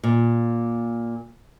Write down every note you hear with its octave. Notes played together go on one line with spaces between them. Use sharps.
A#2